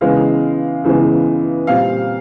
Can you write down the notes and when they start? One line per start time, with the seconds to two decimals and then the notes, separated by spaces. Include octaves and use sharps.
0.01 C#3 E3 G#3 B3 F5
0.84 C#3 E3 G#3 B3
1.67 A#2 G3 C4 F5